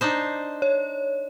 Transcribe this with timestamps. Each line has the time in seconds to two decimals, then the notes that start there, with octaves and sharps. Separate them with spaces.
0.01 D4 D#4 C5
0.62 C#5